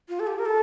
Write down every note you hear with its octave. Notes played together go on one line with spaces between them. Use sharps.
F4
A4
G4
A#4
A4